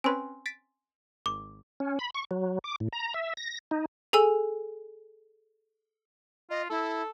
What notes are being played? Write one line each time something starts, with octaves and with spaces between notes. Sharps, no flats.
C4 C#4 B4 G#5 C6
A6 B6 D7
G#1 D6
C#4
B5
C#6
F#3
D6
A2
A#5
E5
A#6
D#4
G#4 A4 G#5 E6
F4 D#5
E4 A4